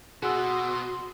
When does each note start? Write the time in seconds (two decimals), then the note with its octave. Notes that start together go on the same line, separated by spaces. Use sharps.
0.23 B2 F#4 G#4 C6 E6